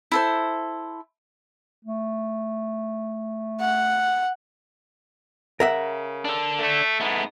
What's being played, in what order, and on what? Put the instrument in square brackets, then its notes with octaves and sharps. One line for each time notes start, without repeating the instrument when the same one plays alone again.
[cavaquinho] E4 A4 C5
[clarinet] A3
[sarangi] F#5
[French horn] C#3 [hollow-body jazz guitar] A#4 E5 F#5
[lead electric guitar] D4 A4
[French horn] A3
[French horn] G#2 [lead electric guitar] A3 B3